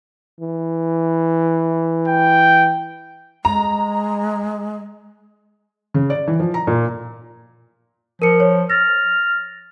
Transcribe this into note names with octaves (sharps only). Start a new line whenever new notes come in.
E3
G5
G#3 A#5
C#3
D5
E3
F3
A#5
A#2
F3 A#4 C#7
C#5
F6 A6 A#6